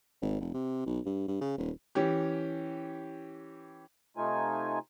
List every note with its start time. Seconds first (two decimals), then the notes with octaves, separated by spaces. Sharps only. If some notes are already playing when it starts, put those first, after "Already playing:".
0.22 G#1
0.40 F1
0.54 C3
0.86 B1
1.06 G2
1.28 G2
1.41 C#3
1.58 D#1
1.95 E3 C#4 G4
4.17 C3 A3 D#4 F4 G#5